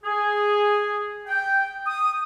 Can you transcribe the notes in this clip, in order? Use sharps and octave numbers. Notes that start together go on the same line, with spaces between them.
G#4
G5
D#6